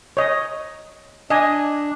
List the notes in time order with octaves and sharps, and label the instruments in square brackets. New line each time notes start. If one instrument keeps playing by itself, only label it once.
[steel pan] C#5 D#5
[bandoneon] D4 [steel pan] D#5 G#5